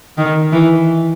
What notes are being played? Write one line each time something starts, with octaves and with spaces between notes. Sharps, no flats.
D#3
E3